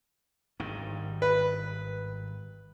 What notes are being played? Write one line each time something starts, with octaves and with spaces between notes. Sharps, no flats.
G#1 G2 D#3
B4